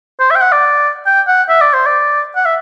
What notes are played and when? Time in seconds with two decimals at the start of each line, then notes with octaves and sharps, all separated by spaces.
0.20 C5
0.30 E5
0.36 G5
0.41 F#5
0.52 D5
1.06 G5
1.28 F#5
1.49 E5
1.61 D5
1.74 C5
1.86 D5
2.36 F#5
2.45 E5